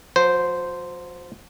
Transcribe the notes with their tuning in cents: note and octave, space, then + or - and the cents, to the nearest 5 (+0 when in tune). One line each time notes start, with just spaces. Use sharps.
F#3 -45 C5 -10